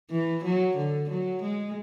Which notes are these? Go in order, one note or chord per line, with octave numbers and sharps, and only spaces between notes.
E3
F#3
D3
F#3
G#3